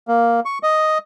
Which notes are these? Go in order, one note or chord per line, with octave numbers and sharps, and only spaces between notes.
A#3
C#6
D#5